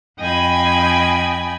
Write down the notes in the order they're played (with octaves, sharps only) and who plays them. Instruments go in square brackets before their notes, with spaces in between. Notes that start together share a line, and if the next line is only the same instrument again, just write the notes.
[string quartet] F2 D#5 G5 G#5 B5 G#6